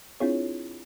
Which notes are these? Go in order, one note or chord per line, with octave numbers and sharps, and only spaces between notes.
C4 D4 E4 F4 G#4 C#5